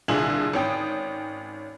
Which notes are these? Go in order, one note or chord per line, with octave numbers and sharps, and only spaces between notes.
C2 A#2 D3 F4 G#4 F#7
G#1 C#4 G5 D#6